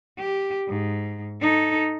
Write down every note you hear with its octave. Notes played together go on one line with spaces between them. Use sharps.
G4
G#2
D#4 A4